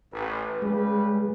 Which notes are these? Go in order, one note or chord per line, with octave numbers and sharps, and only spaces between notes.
A1 B4
C#3 G3 G#3 B4